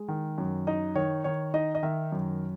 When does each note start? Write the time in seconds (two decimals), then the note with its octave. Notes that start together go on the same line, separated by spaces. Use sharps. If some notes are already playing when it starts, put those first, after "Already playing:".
Already playing: G#3
0.08 D#3
0.38 F#2
0.67 D#4 D#5
0.95 D#3 C#5
1.24 D#3 C#5
1.54 D#4 D#5
1.75 D#5
1.83 D#3 E5
2.12 F#2